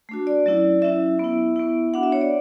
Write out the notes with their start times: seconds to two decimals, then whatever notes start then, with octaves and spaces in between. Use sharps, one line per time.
0.09 A3 D4 F#4
0.27 D5
0.46 F#3 C#4 E4
0.82 F#3 C#4 E4 E5
1.19 B3 E4
1.56 B3 E4
1.94 B3 D4 F#4 F#5
2.03 E5
2.12 C#5
2.21 D5